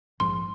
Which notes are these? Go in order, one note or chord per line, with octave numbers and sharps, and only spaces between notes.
A#1 G#2 F3 C6